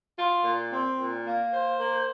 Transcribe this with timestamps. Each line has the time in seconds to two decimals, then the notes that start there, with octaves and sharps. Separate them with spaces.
0.17 F4
0.44 A#2
0.71 C4
0.98 A#2
1.24 A#3
1.51 C5
1.78 A#3